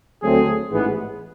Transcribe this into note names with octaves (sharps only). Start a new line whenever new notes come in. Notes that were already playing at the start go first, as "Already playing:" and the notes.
D2 D3 F#3 A3 C4 G#4
A1 G#2 E3 G#3 B3